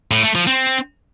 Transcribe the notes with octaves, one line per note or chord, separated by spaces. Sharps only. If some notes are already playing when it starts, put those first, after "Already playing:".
A2
A3
F3
C4